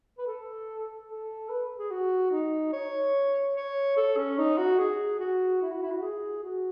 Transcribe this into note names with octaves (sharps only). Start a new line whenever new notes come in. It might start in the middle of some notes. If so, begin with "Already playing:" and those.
B4
A4
A4
B4
G#4
F#4
D#4
C#5
C#5
A4
C#4
D#4
F#4
G#4
F#4
E4
F#4
E4
F#4
G#4
F#4